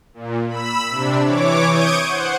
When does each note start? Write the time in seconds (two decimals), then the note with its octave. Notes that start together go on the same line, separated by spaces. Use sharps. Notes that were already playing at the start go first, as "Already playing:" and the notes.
0.14 A#2
0.48 B5 E6
0.88 C3 D4
1.23 E3 C#5 D6
1.70 C#6 D#6 G6 G#6 D7 D#7
2.05 C5 F#5